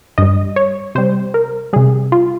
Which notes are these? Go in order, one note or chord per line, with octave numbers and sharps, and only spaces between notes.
G2 G3 D#5
C#5
C3 G3 C5
A#4
C3 G3 G#4
F4